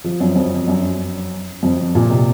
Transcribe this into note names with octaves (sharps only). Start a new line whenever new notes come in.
F3
F#2
F2
F#2
F2
A#2
C3